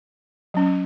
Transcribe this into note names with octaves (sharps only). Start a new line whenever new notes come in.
F#3 C#4